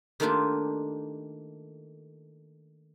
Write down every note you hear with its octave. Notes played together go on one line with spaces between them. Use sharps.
D#3 A3 A#3 D4 F4 G4